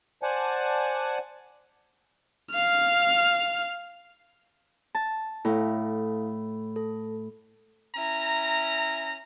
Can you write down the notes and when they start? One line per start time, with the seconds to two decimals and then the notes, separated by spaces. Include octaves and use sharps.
0.23 C5 D5 F#5 G#5 A5
2.51 F5 F6
4.95 A5
5.45 A2 E4 A4 F5
6.76 A4
7.95 C#4 E4 A#5